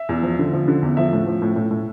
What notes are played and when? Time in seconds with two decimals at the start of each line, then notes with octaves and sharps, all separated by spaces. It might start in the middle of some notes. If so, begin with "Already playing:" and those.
Already playing: E5
0.09 E2
0.23 F3
0.39 D3
0.53 F3
0.68 D3
0.83 E2
0.97 F3 E5
1.13 A2
1.27 F3
1.42 A2
1.56 A2
1.71 A2